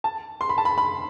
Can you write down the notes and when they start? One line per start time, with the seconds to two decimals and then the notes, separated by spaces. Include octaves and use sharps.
0.04 A5
0.41 C6
0.49 B5
0.58 A5
0.65 B5
0.78 B5